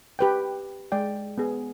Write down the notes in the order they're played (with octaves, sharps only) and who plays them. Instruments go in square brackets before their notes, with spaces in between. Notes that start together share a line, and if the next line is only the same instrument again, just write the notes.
[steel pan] G4 B4 G5
G#3 D5 G5
B3 G#4